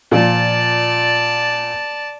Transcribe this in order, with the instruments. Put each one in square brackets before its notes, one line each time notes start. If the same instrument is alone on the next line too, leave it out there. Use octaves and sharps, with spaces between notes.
[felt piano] A#2 F3 [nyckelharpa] D5 A5